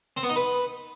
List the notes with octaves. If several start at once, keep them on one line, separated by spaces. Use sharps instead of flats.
C4
B3
D#4
B4